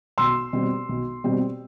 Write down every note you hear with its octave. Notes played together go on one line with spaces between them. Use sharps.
B1 C6 E6
B2 G3 C4
B1
B2 G3 C4